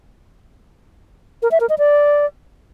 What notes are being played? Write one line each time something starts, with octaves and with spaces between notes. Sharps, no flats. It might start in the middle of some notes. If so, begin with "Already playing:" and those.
A#4
E5
A#4
D#5
D5